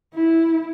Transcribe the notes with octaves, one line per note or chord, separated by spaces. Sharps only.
E4